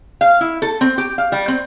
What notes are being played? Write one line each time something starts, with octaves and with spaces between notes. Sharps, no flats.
F5
E4
A4
C4
G4
F5
G3
C4